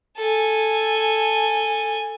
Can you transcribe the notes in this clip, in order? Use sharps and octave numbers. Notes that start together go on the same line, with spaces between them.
A4 G#5